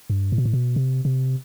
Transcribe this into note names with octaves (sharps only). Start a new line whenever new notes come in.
G2
A2
B2
A2
B2
C3
C3